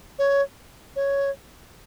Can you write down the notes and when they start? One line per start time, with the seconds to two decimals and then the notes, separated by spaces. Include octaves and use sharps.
0.19 C#5
0.96 C#5